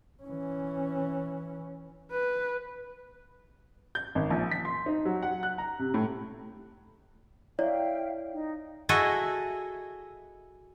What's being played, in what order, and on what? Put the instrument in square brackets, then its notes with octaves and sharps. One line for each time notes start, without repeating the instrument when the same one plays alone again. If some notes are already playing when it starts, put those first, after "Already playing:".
[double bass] E3 C#4
[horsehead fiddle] B4
[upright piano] G6
G#1
A#1
B6
C6
D#4
F#3
F#5
F#6
A#5
C3
A2
[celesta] E4 C#5 D5 [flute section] E5 F5 G5
[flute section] D#4
[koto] E4 F#4 G#4 A4 D#5 E5